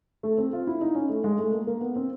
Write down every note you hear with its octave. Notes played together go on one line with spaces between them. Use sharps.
A3
C4
F4
E4
D#4
C#4
A3
G#3
A3
A#3
A#3
B3
C4